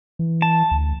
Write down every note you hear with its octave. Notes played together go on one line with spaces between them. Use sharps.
E3
A5
D2